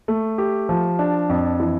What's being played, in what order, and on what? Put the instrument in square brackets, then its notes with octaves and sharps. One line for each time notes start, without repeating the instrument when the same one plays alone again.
[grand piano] A3
G4
F3
D4
F2
E3